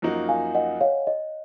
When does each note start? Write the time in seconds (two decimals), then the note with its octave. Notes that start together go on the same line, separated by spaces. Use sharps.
0.02 F#2 F3 A#3 D#4 F#4
0.29 F5 G#5
0.55 D#5 F#5
0.81 C#5 F5
1.07 D#5